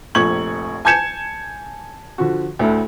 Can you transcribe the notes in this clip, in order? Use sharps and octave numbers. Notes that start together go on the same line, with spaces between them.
F1 A#1 F3 C#6 G#6 F#7
G#5 A5 G6 G#6 C#7 E7
D3 F3 F#4
D2 A2 E4 A4